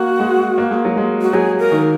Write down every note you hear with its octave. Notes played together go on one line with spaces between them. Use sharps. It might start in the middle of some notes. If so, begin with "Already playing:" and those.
Already playing: A#3 F#4
G#3
A#3
G#3
F#3
G#3
F#4
F#3 G#4
A#4
D#3